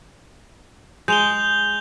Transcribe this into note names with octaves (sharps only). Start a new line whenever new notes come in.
G#3 G6 F7 G7